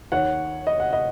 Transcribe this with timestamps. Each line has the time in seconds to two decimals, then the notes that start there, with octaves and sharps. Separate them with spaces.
0.12 D#2 D#3 C#5 F#5
0.67 D#5
0.80 F#5
0.93 D#5